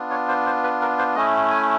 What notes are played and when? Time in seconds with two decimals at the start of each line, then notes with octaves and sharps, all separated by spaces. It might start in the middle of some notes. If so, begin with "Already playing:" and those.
Already playing: B3 D4 F4
0.10 C#5
0.28 C5
0.46 C5
0.64 B4
0.81 A#4
0.99 C5
1.16 A3 C#4 E4 D#5
1.51 G#5